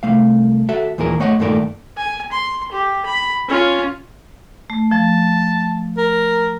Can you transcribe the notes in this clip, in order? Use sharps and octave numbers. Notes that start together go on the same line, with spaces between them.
C2 A3 F5
F#4 A4 E5
D#2 A#2 E3 G#4 A#4
A3 C#5 D#5 F#5
G2 A#2 D#3 A3 A#4 D5
G#5
C6
G4
B5
C#4 F4
A3
F3 A5
A#4